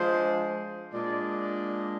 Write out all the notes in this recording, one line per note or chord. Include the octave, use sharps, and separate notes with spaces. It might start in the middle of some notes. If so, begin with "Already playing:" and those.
Already playing: F3 G#3 D4 C5
A#2 G#3 D4 D5
D5